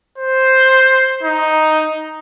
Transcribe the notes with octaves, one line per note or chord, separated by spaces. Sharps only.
C5
D#4